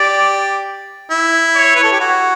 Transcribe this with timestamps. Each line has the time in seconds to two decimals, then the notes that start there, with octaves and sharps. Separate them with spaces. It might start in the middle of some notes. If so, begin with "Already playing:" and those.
Already playing: G4 D5
1.11 E4
1.55 C#5
1.75 B4
1.83 A4
1.92 G4
2.00 F#4